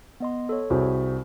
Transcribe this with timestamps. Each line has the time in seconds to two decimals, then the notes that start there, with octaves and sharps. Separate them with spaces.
0.20 B3 D#5 C6
0.49 A4 C#5
0.70 C2 F#4 G#4 C5